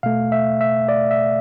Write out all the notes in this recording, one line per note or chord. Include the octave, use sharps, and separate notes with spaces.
B2 A3 F5
E5
E5
D5
E5